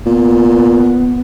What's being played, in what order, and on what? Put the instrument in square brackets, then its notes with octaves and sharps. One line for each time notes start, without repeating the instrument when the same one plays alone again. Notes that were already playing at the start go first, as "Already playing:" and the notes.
[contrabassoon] A#2 [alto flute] B3